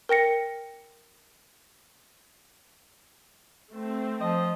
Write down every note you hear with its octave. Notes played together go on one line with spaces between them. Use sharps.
A#4 G5 A#6 C#7
A3 C4
F3 D#5